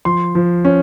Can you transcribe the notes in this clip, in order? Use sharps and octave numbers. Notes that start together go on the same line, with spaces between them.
F3 C6
F3
C#4